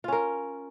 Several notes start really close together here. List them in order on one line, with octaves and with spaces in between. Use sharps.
F4 C#4 A#4